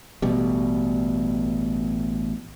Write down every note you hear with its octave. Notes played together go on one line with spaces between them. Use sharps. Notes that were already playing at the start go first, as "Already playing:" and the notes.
A1 B2 G3